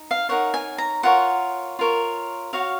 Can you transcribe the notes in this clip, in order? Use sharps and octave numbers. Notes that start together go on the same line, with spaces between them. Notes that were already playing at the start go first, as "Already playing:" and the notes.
Already playing: D#4
F5
D#4 A#4 C#5 F#5
G#5
A#5
F4 A#4 C#5 F#5
F4 A#4 C#5
F#4 C#5 F5